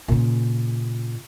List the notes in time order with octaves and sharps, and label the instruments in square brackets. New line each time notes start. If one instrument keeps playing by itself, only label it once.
[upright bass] A#2 C#3